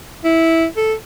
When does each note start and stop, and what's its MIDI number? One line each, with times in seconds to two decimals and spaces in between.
0.25 0.66 64
0.77 0.93 69